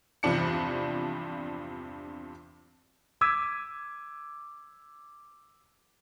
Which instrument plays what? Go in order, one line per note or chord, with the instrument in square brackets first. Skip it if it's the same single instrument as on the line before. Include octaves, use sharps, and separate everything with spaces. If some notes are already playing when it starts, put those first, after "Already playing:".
[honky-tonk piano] E2 G2 C3 F3 D4 C#7
[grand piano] D6 E6 G#6 B6 D#7